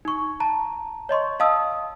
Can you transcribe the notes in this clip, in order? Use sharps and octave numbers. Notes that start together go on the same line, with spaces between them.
D#4 C#6
A5 A#5
C#5 D#5 C6 C#6
D#5 F5 A5 D#6 E6